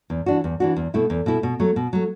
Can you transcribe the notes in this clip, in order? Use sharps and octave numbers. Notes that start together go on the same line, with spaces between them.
E2
E3 D4 F#4
E2
E3 D4 F#4
E2
B2 A3 E4
E2
B2 A3 E4
B2
F#3 A3
B2
F#3 A3